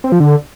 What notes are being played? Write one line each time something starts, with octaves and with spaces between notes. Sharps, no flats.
C4
F3
D3